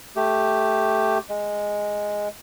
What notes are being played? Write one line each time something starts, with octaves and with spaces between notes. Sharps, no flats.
A3 G4
G#3